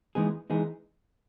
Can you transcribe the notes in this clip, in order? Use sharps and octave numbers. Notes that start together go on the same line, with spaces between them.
E3 G#3 B3 D#4 G#4
E3 G#3 B3 D#4 G#4